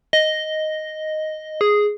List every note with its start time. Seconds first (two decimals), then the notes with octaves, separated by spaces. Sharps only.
0.13 D#5
1.61 G#4